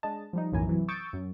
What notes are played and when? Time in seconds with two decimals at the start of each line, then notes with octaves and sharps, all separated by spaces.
0.03 G#3 D4 D#5 A5
0.33 F3 G3 D#4
0.52 B1 F#2 A2 E3 G#5 A#5
0.67 C3 E3 F#3
0.88 C#6 D#6 E6 G6 A6 D7
1.13 F#2